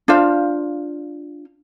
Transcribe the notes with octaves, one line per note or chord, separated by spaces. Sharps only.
D4 F4 C5 F5